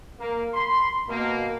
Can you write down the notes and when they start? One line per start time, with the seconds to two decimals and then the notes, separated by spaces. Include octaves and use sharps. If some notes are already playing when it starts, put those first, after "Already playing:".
0.19 A#3
0.54 B5 C6
1.09 B2 A#3